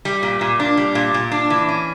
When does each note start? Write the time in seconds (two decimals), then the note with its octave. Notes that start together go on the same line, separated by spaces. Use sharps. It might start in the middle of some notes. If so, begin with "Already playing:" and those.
0.05 G3
0.23 A#2
0.41 A#2
0.60 D4
0.77 G3
0.95 A#2
1.14 A#2
1.31 D4
1.50 E3
1.69 C#4